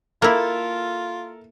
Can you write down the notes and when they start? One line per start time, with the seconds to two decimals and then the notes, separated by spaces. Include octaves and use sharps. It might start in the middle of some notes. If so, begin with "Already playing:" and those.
0.22 A#3 E4 F4 A4 A#4 E5